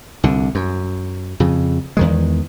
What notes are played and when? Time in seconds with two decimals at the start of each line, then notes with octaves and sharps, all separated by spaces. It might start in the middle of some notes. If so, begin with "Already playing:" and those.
0.24 C2 D3
0.55 F#2
1.40 F2 C#3
1.97 E2 D#3 G#3